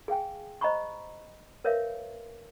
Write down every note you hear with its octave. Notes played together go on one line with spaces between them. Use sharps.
G#4 F5 G5 G#5
C5 D#5 A#5 B5 C#6
A#4 B4 C#5 E5 F5